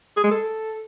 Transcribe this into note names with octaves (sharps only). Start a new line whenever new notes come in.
G#4
G#3
A4